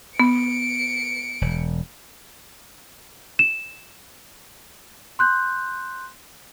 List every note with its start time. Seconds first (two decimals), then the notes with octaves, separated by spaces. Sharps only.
0.20 B3 C#7 D7
1.41 E1
3.39 E7
5.19 C6 F#6 G6